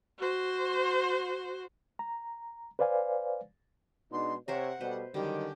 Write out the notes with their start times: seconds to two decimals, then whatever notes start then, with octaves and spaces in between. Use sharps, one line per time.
0.19 F#4 C5
1.99 A#5
2.79 B4 C5 D5 F5 G#5
4.12 B2 G#3 D4 D#4 C6
4.48 C3 A#4 C5 C#5 E5 F#5
4.80 B2 G3 A3 B4 C5
5.14 D3 D#3 F#3 G3 C#4 G4